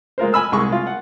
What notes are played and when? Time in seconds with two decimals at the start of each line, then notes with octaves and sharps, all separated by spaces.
0.18 G#3 F4 A#4 C5
0.33 G#5 B5 E6 F6
0.52 C2 G#3 G#4 C#6
0.72 F4
0.87 F#5